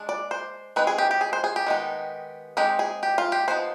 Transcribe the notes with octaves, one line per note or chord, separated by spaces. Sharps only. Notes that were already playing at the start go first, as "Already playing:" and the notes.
Already playing: G#3 D4
D5
C5
G#3 C4 D#4 B4
G#4
G4
G4
G#4
C5
G#4
G4
D#3 G#3 B3 D#4
G#3 C4 D#4 G4
G#4
G4
F4
G4
F3 B3 D#4 C5